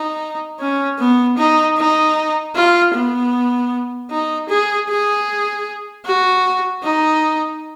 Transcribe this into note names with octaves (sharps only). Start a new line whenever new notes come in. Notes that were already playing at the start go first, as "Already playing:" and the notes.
Already playing: D#4
C#4
B3
D#4
D#4
F4
B3
D#4
G#4
G#4
F#4
D#4